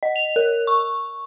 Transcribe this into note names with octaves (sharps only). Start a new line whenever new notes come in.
D#5
F7
A#4
C#6